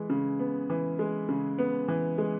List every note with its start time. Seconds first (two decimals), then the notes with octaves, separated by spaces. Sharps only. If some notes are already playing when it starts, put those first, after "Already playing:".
Already playing: E3 G#3
0.10 C#3
0.39 B3
0.70 E3
0.99 G#3
1.29 C#3
1.59 B3
1.88 E3
2.18 G#3